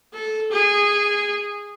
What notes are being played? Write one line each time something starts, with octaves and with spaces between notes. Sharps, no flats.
A4
G#4